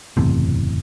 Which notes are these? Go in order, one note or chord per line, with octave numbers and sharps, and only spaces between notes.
F#1 E2 A2 C3